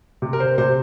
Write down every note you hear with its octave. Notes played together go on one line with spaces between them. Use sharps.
C3
A#4
C5
C3 C5